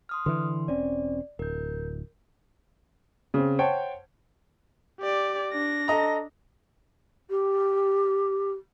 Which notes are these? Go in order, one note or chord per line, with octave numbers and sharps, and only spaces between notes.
C6 D#6 F6
D3 E3 B4 C6
E1 C4 C#4 D5
D1 A#4 G6
C#3 C4
C5 C#5 F#5 G5 A5
G4 D5
D4 A#6
A4 D#5 A#5
G4